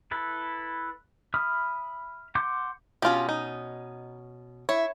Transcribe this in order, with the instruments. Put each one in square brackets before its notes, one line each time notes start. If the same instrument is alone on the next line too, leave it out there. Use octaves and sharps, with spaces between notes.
[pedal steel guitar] E4 A4 B4
E5 B5 D#6 F6
F#5 C6 D6 G6
[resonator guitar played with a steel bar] B2 C#4 [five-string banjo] F4 G4
[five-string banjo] D#4
[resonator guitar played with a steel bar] E4 [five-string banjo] C#5